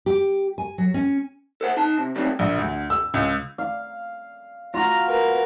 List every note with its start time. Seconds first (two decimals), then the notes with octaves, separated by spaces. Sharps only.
0.06 G4
0.58 G#5
0.78 F#3
0.94 C#4
1.61 A4 C5 F#5
1.77 D#4 A5
1.97 C3
2.16 F#3 G3 A3 C4 D#4
2.39 A#1
2.58 D2
2.90 E6
3.14 C#2
3.58 F5
4.74 F4 F#4 A#5
5.08 A#4 B4